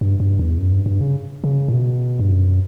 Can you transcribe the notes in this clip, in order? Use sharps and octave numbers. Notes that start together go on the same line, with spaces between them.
G2
G2
E2
F#2
G2
G2
C#3
C#3
A2
B2
G2
F#2